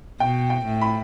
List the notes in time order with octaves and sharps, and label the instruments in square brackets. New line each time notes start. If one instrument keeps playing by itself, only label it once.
[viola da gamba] B2 [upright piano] G5
[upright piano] G5
[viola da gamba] A2
[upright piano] B5